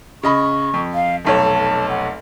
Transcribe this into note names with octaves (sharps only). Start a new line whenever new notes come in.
C#3 D#5 B5 C#6
F2
F5
F1 B1 C#5 A5
F#5